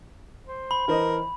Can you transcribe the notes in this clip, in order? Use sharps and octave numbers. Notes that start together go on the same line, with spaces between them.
C5
B5
E3 A#4 C5 D#5